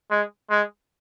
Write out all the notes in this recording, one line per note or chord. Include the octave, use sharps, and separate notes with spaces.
G#3
G#3